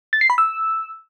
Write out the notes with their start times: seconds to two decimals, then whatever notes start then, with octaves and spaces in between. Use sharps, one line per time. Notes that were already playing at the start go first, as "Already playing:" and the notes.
0.13 A6
0.21 C7
0.30 B5
0.38 E6